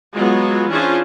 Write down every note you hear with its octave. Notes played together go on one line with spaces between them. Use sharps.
F#3 G#3 B3 F4
E3 C#4 D4 F4 G#4 C5